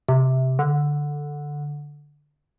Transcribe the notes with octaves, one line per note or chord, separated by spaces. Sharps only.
C3
D3